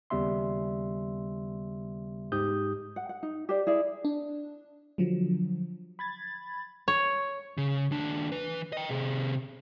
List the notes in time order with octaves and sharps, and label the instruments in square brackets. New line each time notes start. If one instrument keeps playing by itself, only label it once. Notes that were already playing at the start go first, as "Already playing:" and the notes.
[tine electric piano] D#2 C#3 G3 B3 E5 C6
G#2 G4 D#6 G6
[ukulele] F#5
F#5
D#4
G4 C5 D5
E4 G#4 D5
[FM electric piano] D4
D3 F3 F#3
B5 G#6 A6
[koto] C#5
[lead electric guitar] C#3
D#2 D4
E3 B4
D#5 G5
C3 G#4